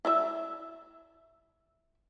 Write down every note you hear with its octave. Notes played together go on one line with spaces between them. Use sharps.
E4 D5 E5